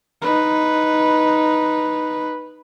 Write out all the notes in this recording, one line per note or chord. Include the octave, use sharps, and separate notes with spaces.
D#4 B4